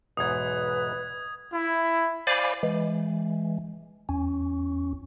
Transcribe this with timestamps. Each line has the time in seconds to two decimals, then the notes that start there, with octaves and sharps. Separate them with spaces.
0.17 B1 E2 G#2 B4 D#6 G#6
1.53 E4
2.27 C5 D5 F5 G#5 B5 D6
2.63 E3 G#3
4.09 E2 C#4